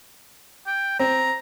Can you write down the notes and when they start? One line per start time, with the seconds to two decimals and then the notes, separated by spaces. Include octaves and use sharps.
0.67 G5
1.00 C4 A#5